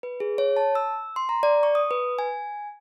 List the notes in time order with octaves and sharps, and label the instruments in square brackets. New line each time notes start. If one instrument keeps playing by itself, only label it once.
[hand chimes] B4
G#4
C#5
A5
E6
C6
A#5
D5
C#6
D#6
B4
G#5